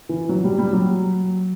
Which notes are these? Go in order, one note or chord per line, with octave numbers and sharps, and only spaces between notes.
E3
F#3
G3
G3
F#3